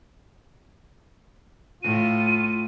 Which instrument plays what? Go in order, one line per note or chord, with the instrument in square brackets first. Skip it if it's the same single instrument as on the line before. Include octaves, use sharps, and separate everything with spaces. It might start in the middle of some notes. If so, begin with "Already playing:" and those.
[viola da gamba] A2 [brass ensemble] F4 [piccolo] D#7